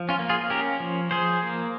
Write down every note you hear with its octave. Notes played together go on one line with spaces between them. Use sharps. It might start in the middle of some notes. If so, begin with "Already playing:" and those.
Already playing: F3
C#4 F4
A#3
F4 G#4
C#4 G4 A#4
F3
F3 G#4 C5
A#3